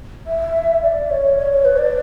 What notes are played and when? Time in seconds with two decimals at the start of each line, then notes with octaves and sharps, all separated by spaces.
0.26 E5
0.83 D5
1.10 C#5
1.37 C#5
1.51 C#5
1.65 B4
1.78 D5